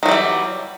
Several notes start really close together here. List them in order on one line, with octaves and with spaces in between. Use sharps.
D#3 F#3 G3 E3